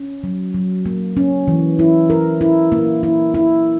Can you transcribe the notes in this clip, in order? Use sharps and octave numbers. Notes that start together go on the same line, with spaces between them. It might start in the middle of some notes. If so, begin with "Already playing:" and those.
Already playing: C#4
F#3
F#3
A#3
C#4
E3
E4
A#4
E4
A#3
E4
E4